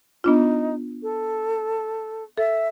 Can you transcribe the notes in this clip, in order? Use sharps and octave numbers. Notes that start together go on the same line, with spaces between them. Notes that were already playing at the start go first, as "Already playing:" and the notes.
B3 D4 D#4 F4
A4
A4 E5